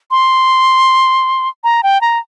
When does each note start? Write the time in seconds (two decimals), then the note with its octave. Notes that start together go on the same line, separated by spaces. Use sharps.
0.11 C6
1.64 A#5
1.83 G5
2.01 A#5